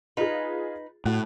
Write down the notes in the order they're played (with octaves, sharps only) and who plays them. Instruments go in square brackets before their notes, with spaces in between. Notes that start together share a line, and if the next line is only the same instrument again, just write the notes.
[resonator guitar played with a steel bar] D#4 B4 [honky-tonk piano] F4 G#4
[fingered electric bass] A2 [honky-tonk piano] F#4 F#6